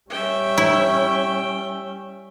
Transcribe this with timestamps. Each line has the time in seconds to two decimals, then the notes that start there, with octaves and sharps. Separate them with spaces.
0.10 G3 C#4 E5 G5
0.58 E4